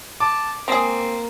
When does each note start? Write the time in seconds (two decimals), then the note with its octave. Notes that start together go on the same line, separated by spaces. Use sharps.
0.20 A5 D6
0.68 G#3 A#3 C4 G#4